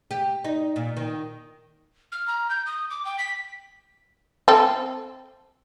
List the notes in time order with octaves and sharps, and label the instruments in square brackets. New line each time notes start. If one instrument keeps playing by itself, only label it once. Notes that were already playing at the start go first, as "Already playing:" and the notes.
[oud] G4
D#4
A#2
D#3
[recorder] F6
A#5
G6
D#6
D6
G5
B6
[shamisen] C4 A4